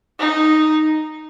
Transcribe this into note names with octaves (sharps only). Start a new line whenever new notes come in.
D#4